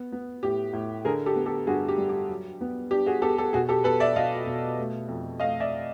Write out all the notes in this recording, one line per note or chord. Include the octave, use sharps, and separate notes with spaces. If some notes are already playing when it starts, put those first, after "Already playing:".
Already playing: B3
B3
A2 G4
A2
D3 G#4 A#4
G4 A4
B3
G4 A4
G2 F#4 G#4
G4
G3
G4
F#3
B3
D4 G4
F#4 G#4
B3 G4 A4
G4 A4
B2 F#4 G#4
G4 A4
B2 A4 B4
D5 E5
B2 D#5 F5
B2
A3
F2
A3 D#5 F5
D5 E5